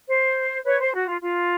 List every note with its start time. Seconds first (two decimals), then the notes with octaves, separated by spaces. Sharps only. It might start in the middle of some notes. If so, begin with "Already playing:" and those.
0.09 C5
0.65 B4 C#5
0.80 C5
0.94 F#4
1.07 F4
1.22 F4